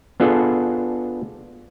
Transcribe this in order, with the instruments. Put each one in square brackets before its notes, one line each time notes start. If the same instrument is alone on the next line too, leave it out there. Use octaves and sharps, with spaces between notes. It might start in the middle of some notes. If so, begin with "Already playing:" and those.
[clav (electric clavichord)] B3 D4 F4 G#4 A4